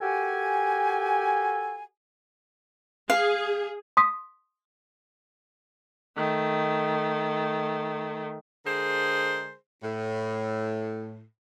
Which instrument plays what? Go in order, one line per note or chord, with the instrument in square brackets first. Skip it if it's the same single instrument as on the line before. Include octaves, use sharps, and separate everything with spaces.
[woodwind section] F#4 G4 A4 A#4 G#5
[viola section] G#4 [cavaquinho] F5
[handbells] C6 D#6 B6
[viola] D#3 A3
[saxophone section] D3 G#3 G#4 A#4 C5
A2